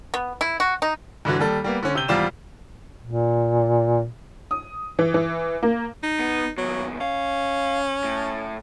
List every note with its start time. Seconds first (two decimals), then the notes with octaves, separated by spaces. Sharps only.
0.14 B3
0.41 E4
0.60 F#4
0.82 D#4
1.25 G2 D3 E3 F#3
1.39 D#2 G3 A4
1.64 G3 A#3 B3
1.83 D3 C#4
1.95 C3 E6 G6 G7
2.08 G#1 E2 G3 F4 D5 E7
3.04 A#2
4.51 D#6
4.99 E3
5.14 E3
5.63 A#3
6.03 D#4
6.20 B3
6.58 D#2 B2 F#3
7.00 C#4 F5
8.04 A2